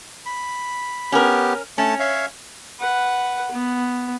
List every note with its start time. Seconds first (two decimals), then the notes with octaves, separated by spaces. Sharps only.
0.26 B5
1.12 B3 C#4 G4 A#4
1.78 A3 C#4 A5
2.00 C#5 E5 F5
2.80 B4 F#5
3.51 B3